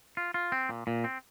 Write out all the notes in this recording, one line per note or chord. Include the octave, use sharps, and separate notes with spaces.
F4
F4
C4
A#2
A#2
C4